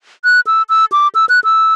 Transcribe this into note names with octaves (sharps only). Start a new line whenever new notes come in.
F#6
E6
E6
D6
E6
F#6
E6